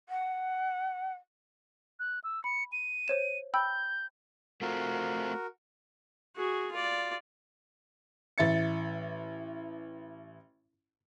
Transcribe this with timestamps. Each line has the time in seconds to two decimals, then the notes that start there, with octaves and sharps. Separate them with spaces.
0.09 F#5
2.00 F#6
2.24 E6
2.44 B5 C#7
2.72 D#7
3.08 C5 C#5 E7
3.54 G5 B5 E6 G6
4.62 A3 C4 F4 F#4 A#4
6.36 F#4 G#4
6.71 F4 D5
8.38 A1 E5 A6 C#7